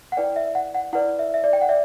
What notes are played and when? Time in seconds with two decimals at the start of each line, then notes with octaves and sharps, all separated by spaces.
0.12 F#5
0.17 E4 B4 D5 G5
0.36 E5
0.55 F#5
0.74 F#5
0.93 E4 B4 D5 F#5
1.19 E5
1.34 E5
1.44 D5
1.53 G5
1.62 F#5
1.69 D5 E5